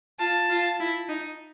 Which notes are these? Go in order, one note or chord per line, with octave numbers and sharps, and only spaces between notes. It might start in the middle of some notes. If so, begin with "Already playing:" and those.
F4 A5
F4
E4
D#4